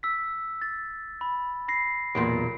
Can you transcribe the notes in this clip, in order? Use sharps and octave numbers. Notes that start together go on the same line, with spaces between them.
E6 B6
A6
B5
B5 A#6 C7
B1 E2 A#2 D7